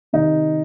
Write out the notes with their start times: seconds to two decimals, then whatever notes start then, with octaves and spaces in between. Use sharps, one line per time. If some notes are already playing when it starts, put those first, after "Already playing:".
0.13 C3 D#3 D#4